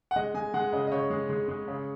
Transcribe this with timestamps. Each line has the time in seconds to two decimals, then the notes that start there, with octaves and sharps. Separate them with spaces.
0.11 F#5
0.16 G#3 D#5
0.34 G#3 G#5
0.54 G#3 F#5
0.73 C#3 D#5
0.87 D#5
0.92 C#3 C#5
1.10 G#3
1.30 G#3
1.48 G#3
1.68 C#3